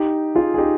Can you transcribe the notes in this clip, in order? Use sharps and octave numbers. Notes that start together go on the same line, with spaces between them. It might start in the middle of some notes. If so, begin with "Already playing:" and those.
Already playing: D#4 G4
F4 G#4
G#4
D#4 G4